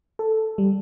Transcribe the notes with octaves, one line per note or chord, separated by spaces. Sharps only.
A4
G3